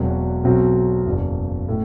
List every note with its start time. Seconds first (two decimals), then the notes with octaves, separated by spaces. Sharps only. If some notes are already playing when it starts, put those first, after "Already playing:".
Already playing: E1 E2 B2 F#3 C4
0.43 B1 B2 F#3 C4
1.06 F#1 E2 B2
1.68 A2